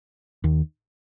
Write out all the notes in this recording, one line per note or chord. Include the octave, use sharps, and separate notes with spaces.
D#2 D#3